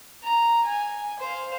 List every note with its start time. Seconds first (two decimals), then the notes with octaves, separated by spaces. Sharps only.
0.23 A#5
0.65 G#5
1.19 C5 F5